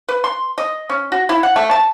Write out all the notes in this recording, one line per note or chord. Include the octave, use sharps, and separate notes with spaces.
B4
C6
D#5
C#4
F#4
E4
F#5
A3
A5